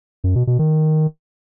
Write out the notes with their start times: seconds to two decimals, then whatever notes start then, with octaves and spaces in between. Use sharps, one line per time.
0.24 F#2
0.35 B2
0.47 B2
0.59 D#3